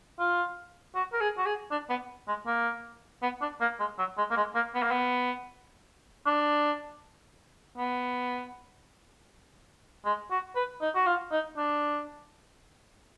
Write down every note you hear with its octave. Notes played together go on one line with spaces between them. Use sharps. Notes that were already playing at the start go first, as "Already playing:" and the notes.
F4
F#4
A#4
G#4
F#4
G#4
D4
B3
G#3
A#3
B3
D4
A#3
G#3
F#3
G#3
A#3
G#3
A#3
B3
A#3
B3
D4
B3
G#3
F#4
B4
D#4
F#4
F4
D#4
D4